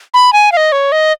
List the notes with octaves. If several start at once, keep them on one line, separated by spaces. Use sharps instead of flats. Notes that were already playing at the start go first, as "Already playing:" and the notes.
B5
G#5
F5
D#5
C#5
D#5